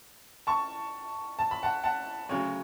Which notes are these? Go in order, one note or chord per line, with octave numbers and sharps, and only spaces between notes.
A5 C#6
A5
B5
F#5 A5
F#5 A5
D2 C#3 F#3 C#5